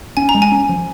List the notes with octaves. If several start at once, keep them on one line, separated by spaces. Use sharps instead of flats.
C#4 G#5
A#5
G#3
G#5
C#4
F3